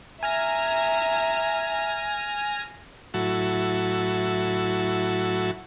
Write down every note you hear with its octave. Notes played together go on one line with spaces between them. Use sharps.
E5 G#5 A#5 F6 A#6
A2 F#3 E4 F#4 A5